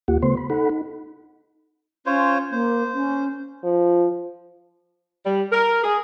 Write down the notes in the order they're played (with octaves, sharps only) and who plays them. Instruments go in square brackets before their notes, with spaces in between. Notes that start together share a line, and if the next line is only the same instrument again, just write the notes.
[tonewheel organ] D#2 A#3 F4 G4 F#5
C#3 A3 B3 C5 C6
B5
D#4 A4 F#5 B5
D#4
[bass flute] C#4 [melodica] F4 C5 C#5
[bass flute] A#3 [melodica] C5
[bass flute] C#4
[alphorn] F3
[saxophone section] G3
A#4
G#4